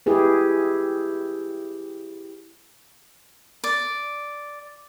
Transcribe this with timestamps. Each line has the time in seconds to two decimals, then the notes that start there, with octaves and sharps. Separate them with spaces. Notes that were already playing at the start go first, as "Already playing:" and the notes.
0.06 E4 G4 G#4 B4
3.64 D5